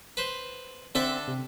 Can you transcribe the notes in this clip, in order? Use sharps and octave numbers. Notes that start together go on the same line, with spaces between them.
B4 C5
D3 C4 A4 E5
C3